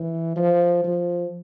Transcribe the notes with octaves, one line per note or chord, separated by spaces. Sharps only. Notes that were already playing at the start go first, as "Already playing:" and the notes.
Already playing: E3
F3
F3